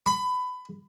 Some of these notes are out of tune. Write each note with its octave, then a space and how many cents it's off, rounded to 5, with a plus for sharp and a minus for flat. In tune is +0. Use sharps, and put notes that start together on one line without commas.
B5 +20